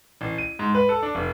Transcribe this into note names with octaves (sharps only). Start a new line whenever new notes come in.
A1
D#7
G#2
B4
A4
D4
F1